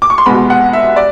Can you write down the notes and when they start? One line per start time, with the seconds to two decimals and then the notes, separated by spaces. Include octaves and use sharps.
0.02 D6
0.10 C#6
0.18 C6
0.26 C2 B2 G#3 B3 B5
0.50 F#5
0.73 E5
0.96 D5